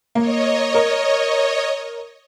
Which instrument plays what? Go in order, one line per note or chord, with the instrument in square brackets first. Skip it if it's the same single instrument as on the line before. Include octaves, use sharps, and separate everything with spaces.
[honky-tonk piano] A#3 [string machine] C#5 D#5
[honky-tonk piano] A#4